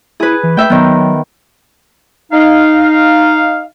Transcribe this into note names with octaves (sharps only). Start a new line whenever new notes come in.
E4 G#4 B4
E3
A3 E5 G5
D#3 F#3 B3
D#4 F5